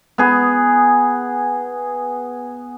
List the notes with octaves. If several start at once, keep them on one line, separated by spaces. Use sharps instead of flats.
B3 G#4